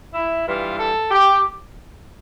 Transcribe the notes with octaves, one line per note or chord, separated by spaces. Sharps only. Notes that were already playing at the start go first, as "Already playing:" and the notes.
E4
G2 E3 G3 F4
A4
G4